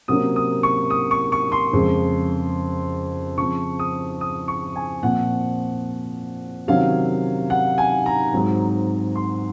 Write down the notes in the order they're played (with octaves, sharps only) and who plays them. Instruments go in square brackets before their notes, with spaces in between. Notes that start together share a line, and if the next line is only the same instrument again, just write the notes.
[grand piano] C3 F#3 A#3 C#4 D#6
D#6
C#6
D#6
C#6
C#6
C6
F2 C#3 G#3
C#3 F3 C4 C#6
D#6
D#6
C#6
G#5
A#2 F3 C4 F#5
C3 D#3 F#3 C#4 F5
F#5
G#5
A#5
G#2 F#3 C4
C6